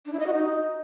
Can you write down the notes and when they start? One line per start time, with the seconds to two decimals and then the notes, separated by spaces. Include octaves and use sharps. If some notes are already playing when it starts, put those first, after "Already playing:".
0.06 D4
0.13 E4
0.20 D#5
0.26 F#4
0.33 D#4